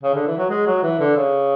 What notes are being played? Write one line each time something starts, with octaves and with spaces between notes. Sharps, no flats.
C#3
D3
E3
F#3
G#3
F#3
E3
D3
C#3